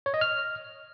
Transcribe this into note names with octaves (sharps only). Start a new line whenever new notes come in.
C#5
D#5
F6